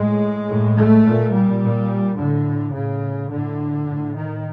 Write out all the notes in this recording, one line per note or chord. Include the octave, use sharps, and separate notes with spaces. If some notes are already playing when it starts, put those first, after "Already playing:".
Already playing: A2 G#3
A2
A3
A#2
G3
A#2
A2 D3
A2 C#3
A2 D3
A2
D#3